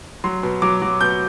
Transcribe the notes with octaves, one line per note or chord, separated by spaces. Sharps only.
F#3 C6
B2
F#3 D6
F#3
B2 G6